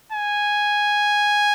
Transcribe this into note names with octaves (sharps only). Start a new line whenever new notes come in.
G#5